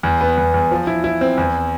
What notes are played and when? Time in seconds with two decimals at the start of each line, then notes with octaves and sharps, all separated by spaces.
0.03 E2
0.21 B3
0.38 E2
0.54 E2
0.71 F3
0.87 E4
1.04 E4
1.21 C4
1.38 E2